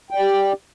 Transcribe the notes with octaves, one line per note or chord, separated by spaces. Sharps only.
G4 D5 G5